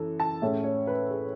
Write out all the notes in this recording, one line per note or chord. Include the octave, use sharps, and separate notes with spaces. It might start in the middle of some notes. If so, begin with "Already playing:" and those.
Already playing: F#2 E3 A4
A5
A2 G#3 C#4 E5
C#5
B4
G#4